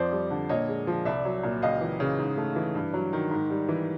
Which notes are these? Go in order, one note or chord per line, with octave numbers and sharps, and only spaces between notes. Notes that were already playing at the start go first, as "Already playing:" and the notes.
Already playing: F2 F3 C5 D5
G3
D3
A#2 C#5 D#5
G#3
F3
C2 D5 E5
F#3
A#2
C#2 D#5 F5
E3
C#3
G#2
A3
E3
G2
F#3
D#3
G#2
G3
E3